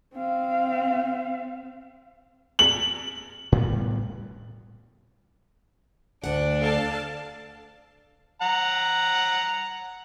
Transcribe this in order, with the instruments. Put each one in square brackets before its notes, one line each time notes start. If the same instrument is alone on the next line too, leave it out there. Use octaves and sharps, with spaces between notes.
[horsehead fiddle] C4 F5
[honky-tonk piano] F#7
[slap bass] A2 G3 B3
[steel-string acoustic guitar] D2 F#5 [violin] D4
[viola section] A4 F5 A5
[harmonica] F#5 A#5